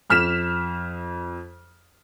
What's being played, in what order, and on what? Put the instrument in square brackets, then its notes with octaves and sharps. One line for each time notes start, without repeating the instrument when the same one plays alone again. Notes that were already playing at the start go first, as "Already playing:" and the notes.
[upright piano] F2 F6 B6 E7